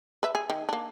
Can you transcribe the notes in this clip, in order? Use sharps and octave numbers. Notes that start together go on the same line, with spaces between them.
B4 E5
G#4
D#3
A#3 D4